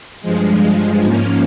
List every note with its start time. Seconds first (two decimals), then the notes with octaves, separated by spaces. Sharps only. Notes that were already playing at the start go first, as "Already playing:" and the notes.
0.22 G2 F3 G#3
1.02 G#2 F3 A#3 C#4